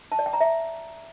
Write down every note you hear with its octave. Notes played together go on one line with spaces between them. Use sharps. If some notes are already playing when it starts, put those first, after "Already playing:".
A5
D5
G5
A#5
E5